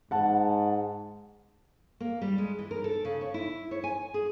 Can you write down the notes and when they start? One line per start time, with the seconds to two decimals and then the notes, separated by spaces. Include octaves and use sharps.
0.11 G#2 F#5 A5
2.00 A#3
2.21 G3
2.38 G#3
2.59 E3
2.71 A#4
2.84 A4
3.05 C#3
3.21 C#5
3.34 E4
3.71 C#5
3.84 G#5
4.14 G#4